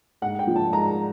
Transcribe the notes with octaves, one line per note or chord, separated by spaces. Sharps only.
G#2 F#5
G5
F3
A5
G#2 A#5